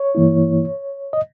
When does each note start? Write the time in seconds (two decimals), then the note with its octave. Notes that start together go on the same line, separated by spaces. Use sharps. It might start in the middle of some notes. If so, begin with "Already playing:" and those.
Already playing: C#5
0.15 G2 E3 A#3 E4
1.13 D#5